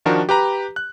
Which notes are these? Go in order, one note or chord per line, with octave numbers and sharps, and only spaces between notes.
D#3 F3 D4 F#4 A#4
G4 B4 A#5
F#6